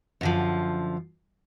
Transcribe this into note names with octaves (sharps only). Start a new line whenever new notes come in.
F#2 D3 F3